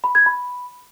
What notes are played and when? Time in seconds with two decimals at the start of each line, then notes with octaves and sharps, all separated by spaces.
0.04 B5
0.15 G#6
0.26 B5